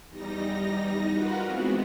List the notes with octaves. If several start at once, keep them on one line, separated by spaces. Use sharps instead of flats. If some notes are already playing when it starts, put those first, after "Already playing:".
E2 G3 D#4 A#6
F4 F#4 A#4 B4 F#5
E3 G#3 B3 C4 F#4